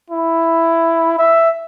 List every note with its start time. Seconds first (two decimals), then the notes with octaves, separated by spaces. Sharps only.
0.10 E4
1.19 E5